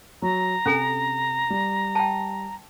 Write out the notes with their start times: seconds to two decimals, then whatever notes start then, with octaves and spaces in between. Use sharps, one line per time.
0.22 F#3 A#5
0.66 C3 C#4 A4 G#5
1.50 G3
1.95 G5 A5